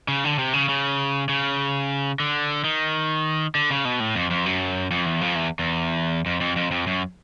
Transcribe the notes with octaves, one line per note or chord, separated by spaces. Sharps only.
C#3
D3
C3
C#3
C#3
C#3
D3
D#3
D3
C#3
B2
A2
F2
F2
F#2
F2
E2
F2
E2
E2
F2
F2
F2
F2
F#2